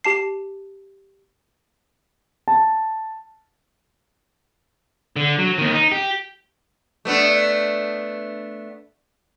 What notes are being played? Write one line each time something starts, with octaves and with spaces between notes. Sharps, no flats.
G4 A5 C7
A5
D3
F#3
D#2 D#3
D#4
G4
A3 B3 D4